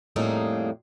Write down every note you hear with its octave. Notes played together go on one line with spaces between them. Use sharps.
F2 A2 G3 A#3 D#4 G#4